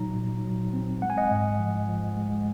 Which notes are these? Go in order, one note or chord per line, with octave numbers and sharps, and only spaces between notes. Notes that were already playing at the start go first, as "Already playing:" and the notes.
Already playing: A#2 F#3 D#4 A#5
A#2
F#3
C4
G#3 F#5
G#5
D#5 F#5
G#2
F3
F3
G#3